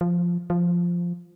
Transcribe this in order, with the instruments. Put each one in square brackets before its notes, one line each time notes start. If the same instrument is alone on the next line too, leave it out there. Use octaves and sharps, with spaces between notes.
[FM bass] F3
F3